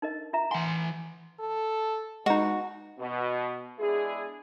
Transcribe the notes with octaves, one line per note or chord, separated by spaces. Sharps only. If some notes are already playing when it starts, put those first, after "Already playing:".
D#4 A#4 D#5
F4 E5 A#5
E3 F#5 G#5 C6
A4
B2 G#3 D#4 F#4
B2
G#3 B3 D4 E4 G#4